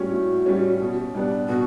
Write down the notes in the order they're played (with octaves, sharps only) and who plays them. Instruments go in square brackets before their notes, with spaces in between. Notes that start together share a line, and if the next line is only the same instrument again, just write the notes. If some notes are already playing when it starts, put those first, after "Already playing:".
Already playing: [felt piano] A2 G3 C#4 [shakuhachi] F#4
[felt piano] A2
G3 C#4
B2
G3 B3 D4
[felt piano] B2 [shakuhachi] F#4